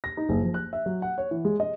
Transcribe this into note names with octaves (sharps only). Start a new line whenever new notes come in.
A#6
D#4
F#1
F3
F#6
E5
F#3
F#5
C#5
E3
G#3
D#5